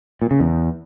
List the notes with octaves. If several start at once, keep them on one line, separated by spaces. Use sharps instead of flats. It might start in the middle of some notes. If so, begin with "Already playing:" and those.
A#2
C#3
E2